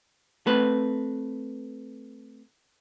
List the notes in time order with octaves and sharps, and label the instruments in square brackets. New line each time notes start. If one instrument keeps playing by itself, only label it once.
[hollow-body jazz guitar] A3 C4 B4